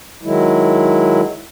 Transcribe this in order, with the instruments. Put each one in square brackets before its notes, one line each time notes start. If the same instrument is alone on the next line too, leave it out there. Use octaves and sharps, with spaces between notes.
[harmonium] D#3 F#3 G#3 E4